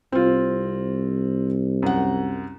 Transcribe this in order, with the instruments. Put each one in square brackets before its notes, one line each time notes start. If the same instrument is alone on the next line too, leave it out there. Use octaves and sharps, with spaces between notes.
[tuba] C2 [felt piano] C4 F4
[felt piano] F#2 F#5